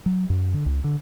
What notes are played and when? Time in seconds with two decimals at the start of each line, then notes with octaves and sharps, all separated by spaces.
0.06 F#3
0.30 F#2
0.54 D3
0.66 C#2
0.84 D3